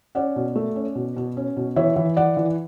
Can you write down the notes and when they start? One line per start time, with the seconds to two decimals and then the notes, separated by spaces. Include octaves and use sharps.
0.15 C#4 D5 F#5
0.36 B2
0.56 A3
0.76 C#4
0.95 B2
1.16 B2
1.37 C#4
1.57 B2
1.76 E3 C#5 E5
1.96 E3
2.17 E3 D5 F#5
2.37 E3